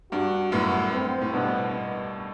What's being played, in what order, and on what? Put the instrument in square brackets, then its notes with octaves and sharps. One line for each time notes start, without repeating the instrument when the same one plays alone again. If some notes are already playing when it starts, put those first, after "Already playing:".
[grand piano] G2 [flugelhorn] F#4
[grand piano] F#2 A2 [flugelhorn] B3
[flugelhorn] C4
[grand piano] A2
[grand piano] G2 B2 [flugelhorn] B3